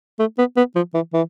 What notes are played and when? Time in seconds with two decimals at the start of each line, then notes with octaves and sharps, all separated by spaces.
0.19 A3
0.38 B3
0.57 B3
0.75 F3
0.94 E3
1.13 E3